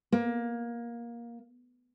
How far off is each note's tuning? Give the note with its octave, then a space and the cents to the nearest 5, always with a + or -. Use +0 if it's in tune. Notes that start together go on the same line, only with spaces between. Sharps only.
A#3 +15